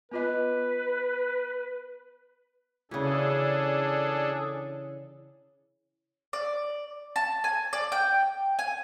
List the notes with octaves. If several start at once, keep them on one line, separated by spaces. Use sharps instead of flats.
B3 F4 B4 D#5
C#3 E3 D4 G#4 A4
D5
A5
G#5
D5
G5
G#5